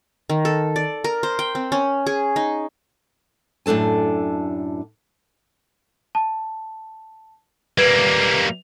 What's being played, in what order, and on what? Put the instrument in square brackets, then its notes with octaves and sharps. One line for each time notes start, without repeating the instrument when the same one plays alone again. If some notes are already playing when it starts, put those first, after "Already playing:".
[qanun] D#3
A4
D5
A#4
C5
G5
C4
C#4
G#4
D#4
[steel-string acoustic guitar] F#2 A2 D4 A4 G#5
[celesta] A5
[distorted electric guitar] G3 A#3 [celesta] B4 G#6 F#7